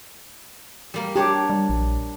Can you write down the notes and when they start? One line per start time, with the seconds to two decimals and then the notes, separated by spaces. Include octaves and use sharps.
0.94 G3 A#3
1.16 D4 G4 C#5
1.50 G3
1.70 A#1